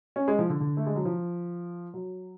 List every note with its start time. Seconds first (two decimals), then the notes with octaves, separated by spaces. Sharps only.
0.16 C#4
0.28 G#3
0.39 F3
0.49 D3
0.60 D3
0.77 A3
0.86 G#3
0.96 F#3
1.05 F3
1.94 F#3